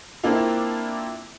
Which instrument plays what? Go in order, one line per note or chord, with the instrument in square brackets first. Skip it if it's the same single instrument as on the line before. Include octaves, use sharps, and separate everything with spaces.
[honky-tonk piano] A#3 C4 D4 E4 F4